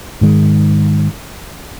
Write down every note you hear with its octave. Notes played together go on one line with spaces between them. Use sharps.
G#2 D#3 G#3